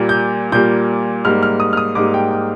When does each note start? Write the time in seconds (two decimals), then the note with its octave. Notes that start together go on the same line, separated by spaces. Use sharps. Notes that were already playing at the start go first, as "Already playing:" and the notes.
Already playing: A#2 G3 A#3
0.09 G6
0.52 A#2 G3 A#3 G6
1.25 G#2 G3 A#3 F6
1.43 F6
1.60 D#6
1.73 F6
1.77 D#6
1.95 G#2 G3 A#3 D6
2.14 G5
2.31 G5